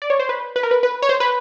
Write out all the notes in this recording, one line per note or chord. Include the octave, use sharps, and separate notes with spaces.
D5
C#5
C5
B4
B4
A#4
B4
B4
C#5
C5
B4